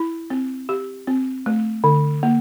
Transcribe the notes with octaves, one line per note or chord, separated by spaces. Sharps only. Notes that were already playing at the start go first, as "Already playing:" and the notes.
Already playing: E4
C4
G4
C4
A3
D3
A#3